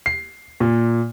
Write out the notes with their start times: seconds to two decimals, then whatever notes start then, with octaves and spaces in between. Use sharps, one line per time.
0.06 C7
0.60 A#2